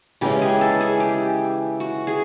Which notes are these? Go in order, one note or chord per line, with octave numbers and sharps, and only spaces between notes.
C#3 E3 G#3 C#4 G4
G#4
A4
G#4
G4
F#4
G#4